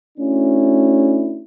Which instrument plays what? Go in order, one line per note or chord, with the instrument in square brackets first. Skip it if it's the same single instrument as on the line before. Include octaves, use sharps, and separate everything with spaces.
[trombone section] A3 C#4 D4 E4 F#4